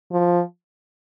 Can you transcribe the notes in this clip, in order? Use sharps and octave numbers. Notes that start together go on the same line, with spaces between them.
F3